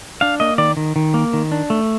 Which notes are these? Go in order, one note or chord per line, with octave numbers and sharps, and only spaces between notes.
D4 F5
A#3 D#5
D#3 D5
D#3
D#3
A#3
D#3
D4
A3